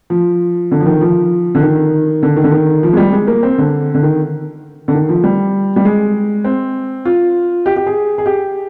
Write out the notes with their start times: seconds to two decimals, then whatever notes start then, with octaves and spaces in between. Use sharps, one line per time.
0.10 F3
0.71 D3
0.80 F3
0.86 D#3
1.01 F3
1.55 D3
1.61 D#3
2.23 D3
2.37 D#3
2.44 D3
2.51 D#3
2.83 F3
2.93 G#3
2.97 G3
3.12 G#3
3.27 A#3
3.43 C4
3.58 D3
3.94 D3
4.03 D#3
4.88 D3
4.94 D#3
5.09 F3
5.24 G3
5.76 G3
5.85 G#3
6.44 C4
7.05 F4
7.66 G4
7.76 G4
7.86 G#4
8.18 G#4
8.26 G4